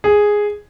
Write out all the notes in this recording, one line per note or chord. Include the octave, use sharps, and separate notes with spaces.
G#4